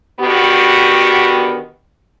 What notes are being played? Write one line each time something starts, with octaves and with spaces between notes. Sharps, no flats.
B2 D3 D#3 B3 F#4 G4